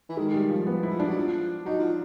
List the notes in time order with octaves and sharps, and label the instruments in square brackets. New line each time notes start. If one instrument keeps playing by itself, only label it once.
[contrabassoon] E3
[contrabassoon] D#3 [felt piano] G#3
[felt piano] G3
F3
B3
E4
[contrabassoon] F3
[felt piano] D4
[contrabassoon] F#3
F3
[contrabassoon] F#3 [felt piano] D#4
[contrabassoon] F3